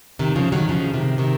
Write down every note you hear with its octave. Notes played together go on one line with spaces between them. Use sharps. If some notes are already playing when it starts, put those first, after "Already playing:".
C3 D#3
C#3 F3
D#3 F#3
C#3 F3
C3 D#3
C3 D#3